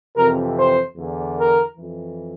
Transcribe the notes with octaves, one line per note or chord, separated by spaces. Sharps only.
F2 C3 E3 A#4
C5
E2 D3
A#4
F2 E3